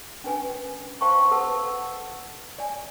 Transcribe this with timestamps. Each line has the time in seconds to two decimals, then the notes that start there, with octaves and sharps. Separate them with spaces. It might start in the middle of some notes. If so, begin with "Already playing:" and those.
0.24 C#4 D4 B4 G#5
1.01 C5 F5 G5 A5 C6 C#6
1.31 A4 B4 F#5 A5 D#6 E6
2.58 D5 G#5